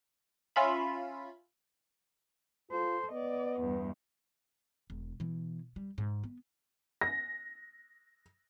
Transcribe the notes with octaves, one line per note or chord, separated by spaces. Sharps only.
C#4 F4 E5 B5
F4 A4 C5
B3 D5 D#5
E2 G2
E1
B2 E3
G3
G#2
B3
A#6